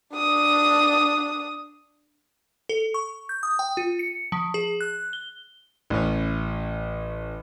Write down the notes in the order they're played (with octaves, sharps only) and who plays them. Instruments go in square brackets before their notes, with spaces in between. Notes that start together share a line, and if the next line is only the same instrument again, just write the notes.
[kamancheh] D4 D#6
[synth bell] A4
C#6
G6
D#6
G5
F4
C#7
F3
G#4
F#6
G7
[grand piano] A1 C#4